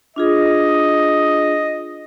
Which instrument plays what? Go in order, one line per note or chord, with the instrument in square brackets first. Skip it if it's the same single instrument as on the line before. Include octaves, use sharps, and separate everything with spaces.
[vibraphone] D4 F4 G#4 [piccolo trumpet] D#5